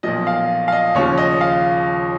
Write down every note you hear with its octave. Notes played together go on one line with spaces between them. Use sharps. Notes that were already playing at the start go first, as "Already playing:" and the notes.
B1 A#2 F3 D#5
F5
F5
D#5
D#2 C#3 F3 C#5
D#5
F5